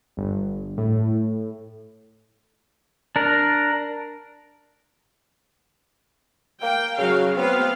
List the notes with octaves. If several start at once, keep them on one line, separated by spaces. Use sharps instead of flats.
G1
A2
D4 A#4
A#3 G5
C#3 F#3 F#4 F5
B3 C4 F5